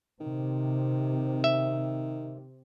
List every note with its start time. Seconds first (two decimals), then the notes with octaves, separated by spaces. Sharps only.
0.20 C3 D#3
1.44 E5